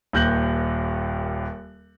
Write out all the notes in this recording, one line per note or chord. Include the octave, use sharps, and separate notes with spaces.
D#1 D#2 F#6 G6 A#6 F#7